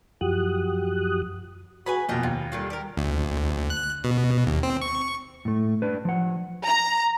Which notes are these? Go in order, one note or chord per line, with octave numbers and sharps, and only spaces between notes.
F#2 F3 F#4 G4 D#6 F#6
F#4 G#4 B4 G#5 B5
F2 B2 A#3 F4 D#5 G5
D#2 F4
D3 D#3 G3 F4
G4 A#4
D2
F#6
B2
D#2
C4
C#6
A2 A3
D4 B4
F3 F#5
A#5